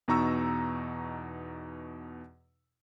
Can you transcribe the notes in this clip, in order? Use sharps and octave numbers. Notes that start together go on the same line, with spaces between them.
E2 B2 D#4 A#5 C#6 E6